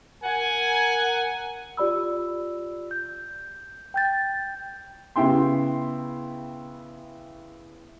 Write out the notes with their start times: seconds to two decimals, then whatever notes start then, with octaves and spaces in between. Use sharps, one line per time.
0.24 A#4 F#5 G#5
1.77 F4 G4 D5 B5 E6
2.91 G6
3.94 G5 G6 A6
5.16 C#3 B3 E4 G5 C6